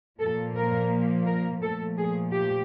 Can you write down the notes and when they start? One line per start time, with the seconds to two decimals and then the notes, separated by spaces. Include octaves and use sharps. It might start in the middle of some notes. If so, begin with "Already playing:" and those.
0.20 A#2 F3 A#3 A4
0.55 A#4
1.26 A#4
1.62 A#2 F3 A3 A4
1.97 G#4
2.32 G4